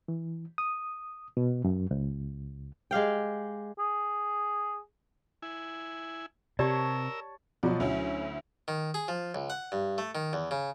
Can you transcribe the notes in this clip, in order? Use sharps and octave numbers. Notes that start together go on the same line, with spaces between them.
E3
D#6
B2
F#2
C#2
G#3 G4 F5 G5
G#4
E4 G#5
C3 G4 A#4 C#5 D5 A5 E6
B2 F3 F#3 D5
D2 F#3 C#4 E4
D#3
G#4
F3
C#2
F#5
G2
A3
D#3
E2
C#3